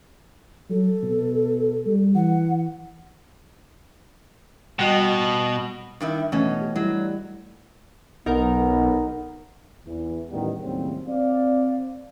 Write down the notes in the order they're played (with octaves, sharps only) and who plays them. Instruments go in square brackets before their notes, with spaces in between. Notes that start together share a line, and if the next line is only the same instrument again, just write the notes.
[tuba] F#3 [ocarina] A4
[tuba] B2
G3
[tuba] E3 [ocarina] F#5
[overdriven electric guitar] B2 [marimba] G3 F#4 D#5
[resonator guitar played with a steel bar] G2 D#3 E4
[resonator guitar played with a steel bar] B2 C#4 [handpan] E3 A3 D#5
[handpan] G4
[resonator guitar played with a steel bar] F#3 [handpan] G3 E4
[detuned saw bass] B1 [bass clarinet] B3 [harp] D#4 A#4
[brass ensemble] E2 E3
A1 E2 D#3 G3 B3
D#2 A2 C#3 F#3 G3 C4
C4 D5 F5